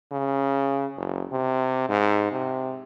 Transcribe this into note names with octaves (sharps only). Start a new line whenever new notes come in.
C#3
F#1
C3
G#2
C3